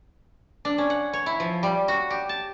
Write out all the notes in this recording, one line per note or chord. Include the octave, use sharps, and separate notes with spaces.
D4
C#4
F#5
C#5
E4
F3
G3
F#4
G4
A5